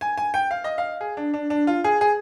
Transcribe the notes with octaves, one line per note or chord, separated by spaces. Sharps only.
G#5
G#5
G5
F5
D#5
F5
G#4
D4
D4
D4
F4
G#4
G#4